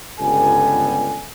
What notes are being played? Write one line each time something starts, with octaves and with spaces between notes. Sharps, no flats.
G1 C#2 G3 B3 A4 G#5